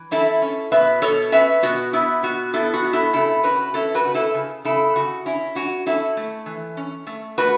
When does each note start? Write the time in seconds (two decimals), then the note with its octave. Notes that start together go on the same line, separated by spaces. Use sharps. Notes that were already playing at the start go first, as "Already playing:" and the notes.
Already playing: E3
0.11 C#4 E4 A4
0.42 C#4
0.72 B2 B4 E5
1.02 B2 A4 C#5
1.32 C#4 B4 E5
1.63 B2 F#4
1.93 B3 E4
2.23 B2 F#4
2.53 B3 E4 A4
2.74 F#4
2.84 B2
2.93 E4 A4
3.13 C#3 E4 A4
3.43 C#4 F#4 B4
3.74 C#4 E4 A4
3.95 F#4 B4
4.04 C#3
4.14 E4 A4
4.34 C#3
4.65 C#3 E4 A4
4.95 C#3 F#4
5.26 C#4 E4
5.55 C#4 F#4
5.86 C#4 E4 A4
6.17 A3
6.46 E3
6.77 C#4
7.07 A3
7.38 A3 F#4 B4